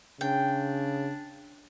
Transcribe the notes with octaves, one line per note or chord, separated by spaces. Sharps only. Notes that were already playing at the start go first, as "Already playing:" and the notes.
C#3 D4 G5